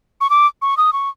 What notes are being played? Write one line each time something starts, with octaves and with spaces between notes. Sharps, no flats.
C#6
D6
C#6
D#6
C#6